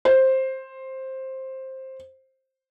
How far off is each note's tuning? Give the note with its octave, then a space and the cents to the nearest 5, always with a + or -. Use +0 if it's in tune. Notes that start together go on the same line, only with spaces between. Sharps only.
C5 +10